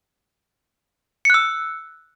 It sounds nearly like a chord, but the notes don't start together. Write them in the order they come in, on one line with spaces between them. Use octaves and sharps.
C#7 F#6 E6